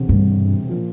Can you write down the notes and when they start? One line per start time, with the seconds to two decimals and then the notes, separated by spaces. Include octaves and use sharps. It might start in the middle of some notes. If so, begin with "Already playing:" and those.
Already playing: E1 D2 C3
0.09 G2
0.69 A#2 F3